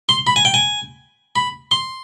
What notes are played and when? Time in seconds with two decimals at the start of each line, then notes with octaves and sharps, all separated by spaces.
0.09 C6
0.27 B5
0.36 G#5
0.45 G5
0.54 G#5
1.36 B5
1.71 C6